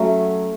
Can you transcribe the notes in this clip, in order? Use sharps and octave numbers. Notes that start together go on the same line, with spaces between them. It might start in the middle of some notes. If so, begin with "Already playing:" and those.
Already playing: F#3 A3 C#4